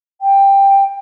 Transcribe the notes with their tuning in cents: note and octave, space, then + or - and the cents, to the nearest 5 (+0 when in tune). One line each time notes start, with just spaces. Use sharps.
G5 +10